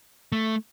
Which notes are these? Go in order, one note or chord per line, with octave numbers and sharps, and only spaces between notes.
A3